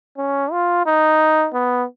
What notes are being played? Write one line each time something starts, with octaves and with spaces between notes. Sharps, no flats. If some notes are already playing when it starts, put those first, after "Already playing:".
C#4
F4
D#4
B3